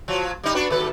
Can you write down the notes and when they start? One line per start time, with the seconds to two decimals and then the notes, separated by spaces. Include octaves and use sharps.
0.08 F3 F#3
0.43 G3 D#4
0.55 B3 D4 F#4
0.70 D#2 A4 B4